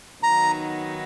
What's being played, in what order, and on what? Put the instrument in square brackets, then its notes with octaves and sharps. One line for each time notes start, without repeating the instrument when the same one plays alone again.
[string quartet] D#3 F#3 B3 D#4 [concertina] A#5